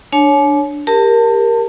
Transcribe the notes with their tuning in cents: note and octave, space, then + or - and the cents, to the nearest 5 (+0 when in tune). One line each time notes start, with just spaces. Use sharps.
D4 +0 C#5 +0 G#5 +45
G4 +20 A#4 +0 A5 +30